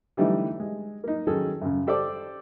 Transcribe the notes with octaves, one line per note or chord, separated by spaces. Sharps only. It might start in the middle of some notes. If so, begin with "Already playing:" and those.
D3 E3 G3 A3 D#4 G4
G#3
A#3 D#4
D#3 F#3 C#4 D#4 G#4 A4
F#2 C#3
G4 A4 C5 D5 D6